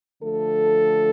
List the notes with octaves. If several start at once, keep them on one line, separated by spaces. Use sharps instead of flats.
D3 F3 A3 A4